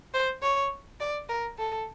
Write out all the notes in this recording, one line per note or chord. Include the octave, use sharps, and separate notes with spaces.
C5
C#5
D5
A#4
A4